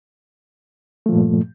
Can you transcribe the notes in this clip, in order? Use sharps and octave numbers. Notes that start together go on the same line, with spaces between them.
G2 A#2 F3 A3